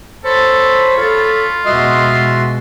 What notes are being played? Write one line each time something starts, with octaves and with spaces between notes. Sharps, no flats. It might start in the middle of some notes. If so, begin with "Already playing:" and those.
A4 C5 C#5 B5
F4 A4
E2 B2 G#3 F#4 D#5 E5 C6